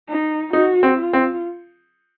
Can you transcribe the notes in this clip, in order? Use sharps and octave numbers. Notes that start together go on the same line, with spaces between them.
D#4
D#4 F#4
C4
F4
C4